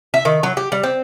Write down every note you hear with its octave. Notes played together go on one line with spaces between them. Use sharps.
E5
D#3
F#3
G4
G3
C4